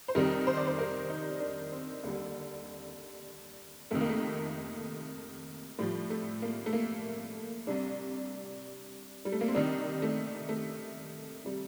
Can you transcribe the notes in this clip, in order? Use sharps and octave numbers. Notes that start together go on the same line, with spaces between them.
C5
F2 C3 D#3 G3 A#4
C5
D5
C5
A#4
D#4
D4
C4
D#2 D3 G3
F2 C3 D#3 A3
A#3
A3
A2 F3 G3
A3
A#3
A3
A#3
C2 C3 G3 D4
G3
A3
A#3
C4
C2 C3 D#3 G3 D4
A3
A3
C3 G3